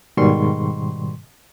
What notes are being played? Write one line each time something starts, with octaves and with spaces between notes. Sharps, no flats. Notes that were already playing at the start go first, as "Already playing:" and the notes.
G#2 B2 D#3 G3 C6 C#6